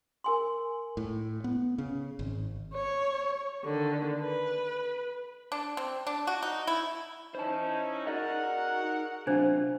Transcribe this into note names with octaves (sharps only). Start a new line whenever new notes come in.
A#4 G#5 C6
A2
B3
C#3
G#1
C#5
D3 D#3
B4
D4
C4
D4
F#4
D#4
E4
C#4 D#4 E4 C5 A5
D#4 F#4 G#4 A#4 D5 D#5 F#5
C3 F#3 D4 F4 C5